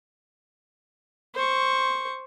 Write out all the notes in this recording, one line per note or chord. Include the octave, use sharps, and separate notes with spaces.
C5 C#6